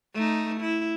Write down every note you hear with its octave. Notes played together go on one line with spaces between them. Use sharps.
A3 D#4
E4